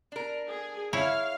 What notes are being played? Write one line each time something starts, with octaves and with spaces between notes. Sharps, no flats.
D4 A#4
G#4
E4 C#5 F5